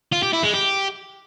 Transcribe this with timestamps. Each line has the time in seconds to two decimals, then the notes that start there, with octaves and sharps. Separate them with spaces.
0.13 F4
0.23 G4
0.33 E4
0.43 G#3
0.54 G4